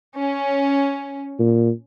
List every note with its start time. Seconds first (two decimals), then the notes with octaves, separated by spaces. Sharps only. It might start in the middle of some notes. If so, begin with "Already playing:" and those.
0.17 C#4
1.39 A#2